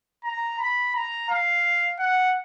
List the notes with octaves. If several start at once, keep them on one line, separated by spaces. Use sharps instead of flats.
A#5
B5
A#5
F5
F#5